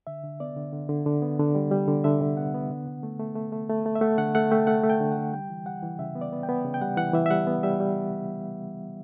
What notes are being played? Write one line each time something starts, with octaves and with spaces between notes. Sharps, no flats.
D3 E5
D3
B3 D5
D3
D3
D3
D3
B3
D3
G3
G3
D3
D3 E5
D3
B3 F#5
B3
D3
D3
A3
A3
A3
A3
A3
A3
E5
A3 F#5
D3 F#5
A3 F#5
A3 G5
A3 F#5
A3
G5
D3
F#5
D3
G3 G5
E3
G3 F#5
E3
C#3 E5
B3
D5
B3
G5
B3
C#3
G5
G3 F#5
E3 F#5
E3 E5
E5
G3 F#5
B3
G3 E5
G3